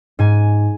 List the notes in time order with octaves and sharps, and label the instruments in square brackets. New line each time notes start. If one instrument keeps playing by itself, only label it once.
[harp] G#2 G#5